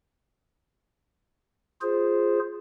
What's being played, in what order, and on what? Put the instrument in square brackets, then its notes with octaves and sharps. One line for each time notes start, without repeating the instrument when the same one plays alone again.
[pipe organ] F4 G#4 C5